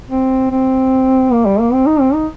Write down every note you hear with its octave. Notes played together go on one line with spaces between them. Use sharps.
C4
C4
A#3
G3
A#3
C4
D#4
C4
D#4